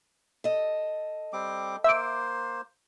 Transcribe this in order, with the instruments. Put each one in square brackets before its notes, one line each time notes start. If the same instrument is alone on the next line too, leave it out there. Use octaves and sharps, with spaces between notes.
[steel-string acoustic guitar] A4 D#5
[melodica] G3 C4 D6
[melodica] A#3 C5 [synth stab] E5 D6